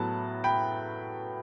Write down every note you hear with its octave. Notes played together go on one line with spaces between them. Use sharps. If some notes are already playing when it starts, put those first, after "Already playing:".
Already playing: A2 F#3 B3 A5
G5 B5